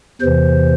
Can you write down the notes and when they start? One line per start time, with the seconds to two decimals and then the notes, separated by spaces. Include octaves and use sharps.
0.21 E2 C3 E3 C5